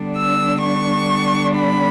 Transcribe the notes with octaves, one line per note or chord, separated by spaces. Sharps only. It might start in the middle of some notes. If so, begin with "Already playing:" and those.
Already playing: D3 G3 B3 D4
E6
C#6
B5